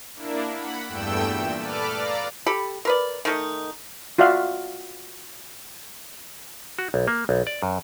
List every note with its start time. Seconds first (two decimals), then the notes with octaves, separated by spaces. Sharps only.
0.15 A#3 D4 E4
0.54 F#5 B5
0.87 E2 G2 A3 G5 E6
1.27 A#2
1.58 A4 B4 D5 D6 F6
1.93 D5 F5 A#5
2.46 G4 A4 B5
2.85 A#4 B4 D5
3.25 D#3 A3 D#4
4.18 F4 F#4 D5 E5 F5
6.79 F#4
6.94 B1
7.08 A#3
7.29 B1
7.47 D5
7.63 F#2